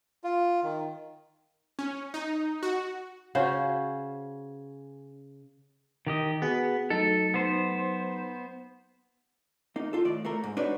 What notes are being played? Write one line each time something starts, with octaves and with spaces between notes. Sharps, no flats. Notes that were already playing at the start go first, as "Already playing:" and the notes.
F4
D#3
C#4
D#4
F#4
C#3 C#4 F#4 C5
D#3 G4 D#5
B3 F#4 G#4
F#3 A3 D#4 A4
B3 C5
A#3 D#4
F4 A4
D#2 A2 D5
A3 A#3 A#4
G#2
D4 D#4 F#4 B4 C#5